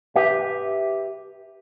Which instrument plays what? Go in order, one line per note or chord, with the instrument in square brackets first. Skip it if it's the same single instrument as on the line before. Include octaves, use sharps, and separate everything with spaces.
[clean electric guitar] G4 B4 E5